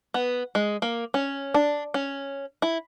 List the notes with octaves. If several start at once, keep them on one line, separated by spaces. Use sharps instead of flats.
B3
G#3
A#3
C#4
D4
C#4
E4